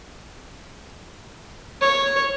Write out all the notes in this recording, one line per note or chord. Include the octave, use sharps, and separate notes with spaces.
C#5